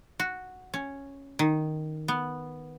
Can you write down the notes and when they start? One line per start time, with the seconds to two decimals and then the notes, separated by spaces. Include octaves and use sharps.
0.20 F#4
0.74 C#4
1.39 D#3
2.08 B3